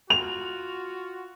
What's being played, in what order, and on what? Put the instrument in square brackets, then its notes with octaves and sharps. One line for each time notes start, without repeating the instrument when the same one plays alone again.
[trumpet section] F4 F#4 [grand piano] F7